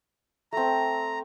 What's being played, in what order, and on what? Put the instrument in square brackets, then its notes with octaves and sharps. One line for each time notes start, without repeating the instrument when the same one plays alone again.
[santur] A3 C4 [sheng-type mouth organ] A#5